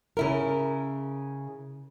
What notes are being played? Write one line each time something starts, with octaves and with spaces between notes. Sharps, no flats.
C#3 E4 A#4